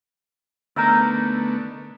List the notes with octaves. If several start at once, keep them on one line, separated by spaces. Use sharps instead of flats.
D3 A3 B3 D#4 A#4 A#5 E6